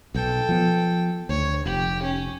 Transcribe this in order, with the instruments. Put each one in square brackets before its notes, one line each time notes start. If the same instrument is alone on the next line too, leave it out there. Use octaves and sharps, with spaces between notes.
[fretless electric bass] B1 [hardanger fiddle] A4 G5
[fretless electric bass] F3 B3
[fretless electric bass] D2 [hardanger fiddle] C#5
[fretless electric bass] F1 [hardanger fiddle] G4
[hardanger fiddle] C#4